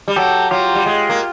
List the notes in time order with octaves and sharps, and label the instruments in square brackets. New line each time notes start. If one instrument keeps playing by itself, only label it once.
[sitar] G3
[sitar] F#3 [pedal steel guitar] G4 A4
[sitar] F#3 [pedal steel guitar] F4 G4
[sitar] G3
G#3
A#3